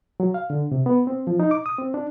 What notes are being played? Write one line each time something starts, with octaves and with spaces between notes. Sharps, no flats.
F#3
F5
D3
C3
B3
C4
F3
D#4
D6
D#6
C4
D4